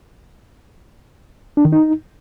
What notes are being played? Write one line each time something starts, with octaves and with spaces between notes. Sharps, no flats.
D4
D#3
D#4